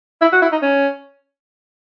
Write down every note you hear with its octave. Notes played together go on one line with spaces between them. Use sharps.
E4
F#4
E4
D#4
C#4